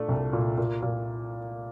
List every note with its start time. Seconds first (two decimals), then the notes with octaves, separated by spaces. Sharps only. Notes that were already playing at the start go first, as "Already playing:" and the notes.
Already playing: A#2 A3 D4
0.09 C2
0.33 A#2
0.58 A#2
0.82 A#2